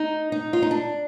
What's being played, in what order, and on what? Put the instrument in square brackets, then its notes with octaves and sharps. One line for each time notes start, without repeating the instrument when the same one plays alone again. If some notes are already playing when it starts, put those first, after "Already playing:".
Already playing: [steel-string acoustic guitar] D#4
D#4
F4
D#4
D4